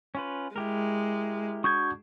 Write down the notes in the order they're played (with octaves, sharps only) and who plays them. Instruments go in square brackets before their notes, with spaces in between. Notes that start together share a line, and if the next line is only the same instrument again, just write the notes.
[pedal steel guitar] C#4 F4 B4
[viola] G#3 [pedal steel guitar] E4 G4 A#4
[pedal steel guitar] D4 F#4 D#6 [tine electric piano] C#6 G6 G#6